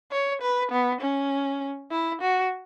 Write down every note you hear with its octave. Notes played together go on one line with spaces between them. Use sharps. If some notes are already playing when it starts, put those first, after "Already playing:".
C#5
B4
B3
C#4
E4
F#4